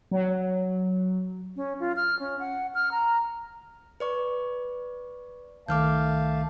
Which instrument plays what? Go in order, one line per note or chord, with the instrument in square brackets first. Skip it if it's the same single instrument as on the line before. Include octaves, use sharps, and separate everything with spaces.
[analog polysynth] F#3
[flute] C#4
F4
F6
C#4
F#5
F6
A#5
[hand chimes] B4 D5 C#6
[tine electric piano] C2 D#3 [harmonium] A3 F5 A5 [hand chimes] D6 F6 G6